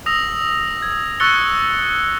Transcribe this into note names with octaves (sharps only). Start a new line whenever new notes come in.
D#6 E6 A#6 F7
G#6
C#6 E6 F#6 A6 C#7 G7